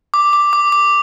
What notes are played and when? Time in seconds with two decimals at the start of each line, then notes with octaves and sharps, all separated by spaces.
0.14 D6
0.33 D6
0.53 D6
0.72 D6